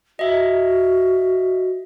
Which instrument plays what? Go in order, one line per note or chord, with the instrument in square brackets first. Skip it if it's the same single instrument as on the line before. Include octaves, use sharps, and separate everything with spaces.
[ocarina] F#4 [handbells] D#5 E5